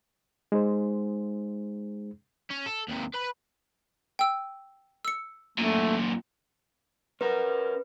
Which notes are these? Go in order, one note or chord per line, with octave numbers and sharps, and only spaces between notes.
G#3 D#4 G#4 C5
C#4
A4
D#2 C3
B4 B5
G5 E6
E6 C#7
F#2 A#2 A3
C#4 A#4 B4